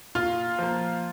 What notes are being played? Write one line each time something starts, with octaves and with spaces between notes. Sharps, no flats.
A#2 F4 F5
F3 A#3